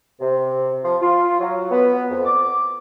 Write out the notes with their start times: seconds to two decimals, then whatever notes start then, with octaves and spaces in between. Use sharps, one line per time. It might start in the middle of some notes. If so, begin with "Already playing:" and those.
0.20 C3
0.84 F3
1.01 F4
1.40 F#3
1.71 B3
2.11 F2
2.25 D6